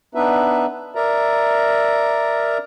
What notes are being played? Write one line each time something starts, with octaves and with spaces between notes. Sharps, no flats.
B3 D4 D#4 B4 E5
A#4 D5 E5 A#5